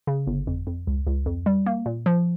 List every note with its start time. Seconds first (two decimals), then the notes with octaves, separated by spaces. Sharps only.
0.07 C#3
0.27 G1
0.47 F2
0.67 F2
0.87 C#2
1.07 C#2
1.26 F2
1.46 G3
1.66 A#3
1.86 A#2
2.06 F3